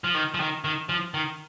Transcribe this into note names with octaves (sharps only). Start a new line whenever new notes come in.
F3
D#3
F3
D#3
D#3
F3
D#3